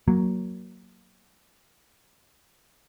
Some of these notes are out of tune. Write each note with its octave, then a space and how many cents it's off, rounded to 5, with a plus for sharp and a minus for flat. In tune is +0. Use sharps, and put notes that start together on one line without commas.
F#3 +0 A#3 +0